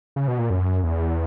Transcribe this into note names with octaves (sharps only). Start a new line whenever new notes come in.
C#3
B2
A#2
F#2
E2